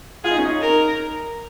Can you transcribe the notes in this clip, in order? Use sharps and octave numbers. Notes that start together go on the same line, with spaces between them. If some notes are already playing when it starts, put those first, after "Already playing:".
F4 G#4
D#4
C#4
D#4
A#4